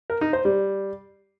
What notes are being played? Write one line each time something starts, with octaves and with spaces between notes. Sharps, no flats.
A#4
D#4
C5
G3